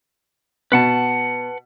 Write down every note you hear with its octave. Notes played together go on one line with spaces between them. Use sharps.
B2 B4 F#5 A5